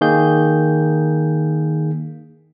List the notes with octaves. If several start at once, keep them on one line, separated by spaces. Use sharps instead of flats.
D#3 A#3 G#4 G6